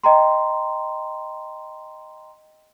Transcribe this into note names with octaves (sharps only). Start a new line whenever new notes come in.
D#5 G5 A#5 C6